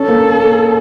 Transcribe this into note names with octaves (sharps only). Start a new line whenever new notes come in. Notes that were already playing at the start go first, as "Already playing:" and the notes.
Already playing: C#4 A4
A#3